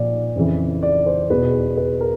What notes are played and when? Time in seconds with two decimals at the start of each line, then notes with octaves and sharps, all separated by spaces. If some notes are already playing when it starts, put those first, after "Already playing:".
Already playing: A#2 F3 D5
0.36 F2 C#3 E3
0.83 D5
1.06 C5
1.30 E2 B2 B4
1.77 B4
2.01 A#4